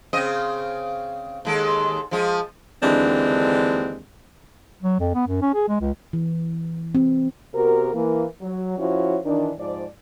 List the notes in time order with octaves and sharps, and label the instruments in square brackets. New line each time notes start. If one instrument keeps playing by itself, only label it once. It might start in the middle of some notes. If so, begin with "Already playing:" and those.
[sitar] C#3 C4 D#5
D#2 G#3 A4
F3 G#3
[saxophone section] D#2 D3 E3 G#3 C4 D4
[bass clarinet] F#3
F2
B3
F#2
C#4
G#4
G#3
C#2
[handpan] E3
C4
[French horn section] C3 B3 F#4 A#4
E3 A#3
F#3
F3 C#4 E4 F#4 C#5
D#3 E3 D4
G#2 F3 D5